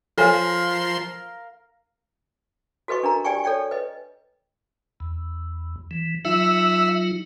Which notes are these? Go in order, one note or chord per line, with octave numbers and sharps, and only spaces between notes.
F3 A4 A#4 C#5 F5 G#5 C6
F#4 A4 B4 D#5 C#6
D4 A#4 A#5
G4 D5 G5 G#5 C#6
A4 C#5 D5 G5 C#6
B4 D#5
E2
E3
F#3 D#4 F4 E5